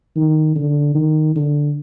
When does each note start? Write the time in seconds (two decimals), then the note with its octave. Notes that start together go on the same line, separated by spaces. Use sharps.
0.16 D#3
0.56 D3
0.95 D#3
1.35 D3